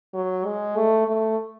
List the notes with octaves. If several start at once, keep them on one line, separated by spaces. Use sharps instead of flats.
F#3
G#3
A3
A3